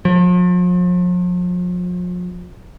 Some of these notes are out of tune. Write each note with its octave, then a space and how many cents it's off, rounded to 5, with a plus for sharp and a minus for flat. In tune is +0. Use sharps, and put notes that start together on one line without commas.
F3 +40